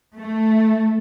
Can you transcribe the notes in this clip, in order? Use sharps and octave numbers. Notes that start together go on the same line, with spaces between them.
A3